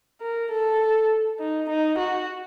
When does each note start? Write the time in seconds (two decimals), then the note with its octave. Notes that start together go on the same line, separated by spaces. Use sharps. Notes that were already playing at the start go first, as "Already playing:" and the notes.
0.21 A#4
0.51 A4
1.40 D#4
1.69 D#4
1.98 F#4